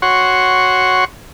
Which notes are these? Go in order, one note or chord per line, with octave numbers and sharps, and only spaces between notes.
F#4 C#5 F#5 C6 C#6